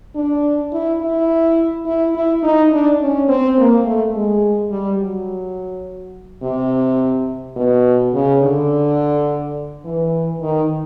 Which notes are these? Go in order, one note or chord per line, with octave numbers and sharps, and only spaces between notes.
D4
E4
E4
E4
E4
D#4
D4
C#4
C4
A#3
A3
G#3
G3
F#3
C3
B2
C#3
D3
E3
D#3